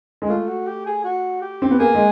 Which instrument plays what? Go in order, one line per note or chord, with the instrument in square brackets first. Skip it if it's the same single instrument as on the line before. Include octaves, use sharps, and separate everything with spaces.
[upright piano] G#3
[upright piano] A3 [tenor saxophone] F4
[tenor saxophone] F#4
G4
G#4
F#4
G4
[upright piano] C4
B3
[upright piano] A#3 [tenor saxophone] G#4
[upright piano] G#3